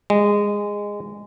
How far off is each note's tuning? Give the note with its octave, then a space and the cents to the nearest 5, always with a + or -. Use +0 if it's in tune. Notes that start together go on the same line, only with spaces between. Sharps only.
G#3 -15